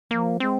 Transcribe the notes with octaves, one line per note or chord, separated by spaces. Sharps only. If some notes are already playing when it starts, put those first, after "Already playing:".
F3 A#3
G#3 C4